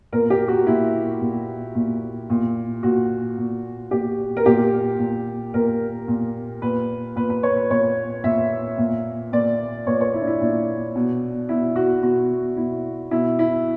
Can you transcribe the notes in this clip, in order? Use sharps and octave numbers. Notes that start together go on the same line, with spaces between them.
A#2 A#4
G4
F#4
A#2 E4
A#2
A#2
A#2
A#2 F#4
A#2
A#2 G4
A#4
A#2 G4
A#2
A#2 A#4
A#2
A#2 B4
A#2 B4
B4
C#5
B4
A#2 C#5
A#2 E5
A#2
A#2 D5
A#2 C#5
C#5
E4
D4
E4
A#2 D4
B2
B2 E4
F#4
B2 F#4
B2 E4
B2 E4
E4